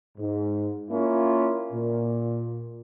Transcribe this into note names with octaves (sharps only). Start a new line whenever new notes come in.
G#2
A#3 C#4 E4 F4
A#2